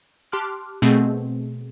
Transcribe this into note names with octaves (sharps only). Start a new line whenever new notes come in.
G4 A5 C6 D6 F6 F#6
B2 A3 C4 G#4